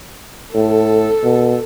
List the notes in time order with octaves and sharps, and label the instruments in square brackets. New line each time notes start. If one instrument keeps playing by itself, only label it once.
[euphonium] A2 [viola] A4
[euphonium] B2